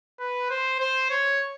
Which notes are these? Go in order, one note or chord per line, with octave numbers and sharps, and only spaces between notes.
B4
C5
C5
C#5